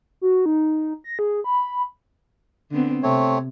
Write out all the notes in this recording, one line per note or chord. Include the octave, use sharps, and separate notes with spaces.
F#4
D#4
A#6
G#4
B5
D3 B3 C4
C3 A3 C4 C#5